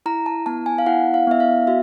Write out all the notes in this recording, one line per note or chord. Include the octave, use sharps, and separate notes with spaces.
E4 A#5
A5
B3 A5
G#5
F5
E4 F#5
F5
B3 E5
F5
F#4 E5